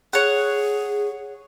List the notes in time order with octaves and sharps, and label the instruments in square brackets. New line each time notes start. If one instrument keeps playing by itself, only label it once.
[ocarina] G#4 [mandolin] C#5 F#5